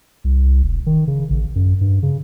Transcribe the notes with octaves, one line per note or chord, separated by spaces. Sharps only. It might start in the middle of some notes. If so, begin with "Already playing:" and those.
C2
E1
D#3
C#3
A1
F#2
G2
C#3